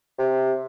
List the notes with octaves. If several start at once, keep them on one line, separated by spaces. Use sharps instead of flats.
C3